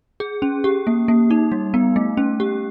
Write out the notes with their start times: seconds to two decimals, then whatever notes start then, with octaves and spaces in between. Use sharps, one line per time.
0.20 G#4
0.42 C#4
0.64 G4
0.87 A#3
1.08 A#3
1.31 D#4
1.52 G3
1.74 B3
1.96 A3
2.17 C#4
2.40 G4